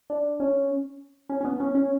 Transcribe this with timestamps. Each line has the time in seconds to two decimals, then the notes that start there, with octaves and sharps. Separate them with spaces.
0.10 D4
0.40 C#4
1.29 C#4
1.41 C#4
1.45 B3
1.60 C#4
1.75 C#4